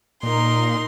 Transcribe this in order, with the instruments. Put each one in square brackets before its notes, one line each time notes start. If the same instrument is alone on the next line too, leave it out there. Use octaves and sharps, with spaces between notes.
[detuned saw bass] A#2 [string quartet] D#4 A#4 C6